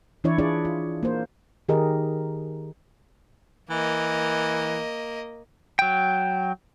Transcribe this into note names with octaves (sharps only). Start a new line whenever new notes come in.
E3 D4 E4 C#5 D5
D4 E4 F4 G#4 C#5 D5
F4
A#3 C5
D#3 G4 G#4 A#4 D#5
E3 A#3 D#5
F#3 G5